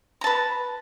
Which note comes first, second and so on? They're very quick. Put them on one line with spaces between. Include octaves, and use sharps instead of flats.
A#5 A5 B4